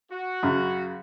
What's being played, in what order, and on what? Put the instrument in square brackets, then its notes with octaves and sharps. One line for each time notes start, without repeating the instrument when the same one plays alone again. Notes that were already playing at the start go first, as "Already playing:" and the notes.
[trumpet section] F#4
[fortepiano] F#2 C#3